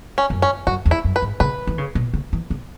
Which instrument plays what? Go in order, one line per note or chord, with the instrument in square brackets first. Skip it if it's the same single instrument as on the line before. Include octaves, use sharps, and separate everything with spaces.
[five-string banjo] C#4
[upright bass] F#2
[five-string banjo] C#4
[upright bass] F#2 [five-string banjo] F#4
[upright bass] E2
[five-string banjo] E4
[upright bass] F#2
[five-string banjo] B4
[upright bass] G#2
[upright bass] C#3 [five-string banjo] B4
[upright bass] E3
C#3
B2
C#3
E3
C#3